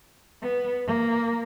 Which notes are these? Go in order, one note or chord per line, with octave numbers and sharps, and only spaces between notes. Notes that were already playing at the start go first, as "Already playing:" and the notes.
B3
A#3